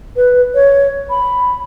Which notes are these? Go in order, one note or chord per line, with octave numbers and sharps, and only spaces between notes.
B4
C#5
B5